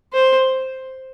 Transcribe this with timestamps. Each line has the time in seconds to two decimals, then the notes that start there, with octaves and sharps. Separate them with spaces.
0.13 C5